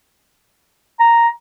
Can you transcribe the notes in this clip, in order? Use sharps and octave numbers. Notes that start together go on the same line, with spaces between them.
A#5